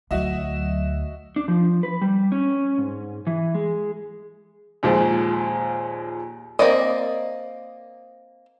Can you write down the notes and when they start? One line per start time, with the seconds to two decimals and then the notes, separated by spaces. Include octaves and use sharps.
0.11 D2 F#3 F#4 D#5 E5 E7
1.36 D4
1.48 F3
1.83 B4
2.02 G3
2.32 C#4
2.78 G#2
3.27 E3
3.55 G#3
4.83 D#2 A#2 F3 G#3
6.59 A#3 C4 D5 D#5